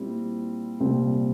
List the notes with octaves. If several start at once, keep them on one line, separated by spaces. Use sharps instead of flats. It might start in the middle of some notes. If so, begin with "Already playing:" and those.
Already playing: A#2 G3 C4 E4
C2 A#2 G3 C4